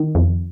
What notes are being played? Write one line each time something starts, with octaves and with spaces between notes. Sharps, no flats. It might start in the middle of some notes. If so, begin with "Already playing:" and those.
Already playing: D#3
F2